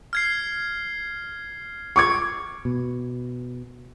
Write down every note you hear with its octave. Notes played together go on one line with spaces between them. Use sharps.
F6 G#6 C7
C#6 D6 G#6 C#7
B2